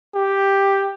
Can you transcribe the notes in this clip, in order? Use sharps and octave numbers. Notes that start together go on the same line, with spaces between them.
G4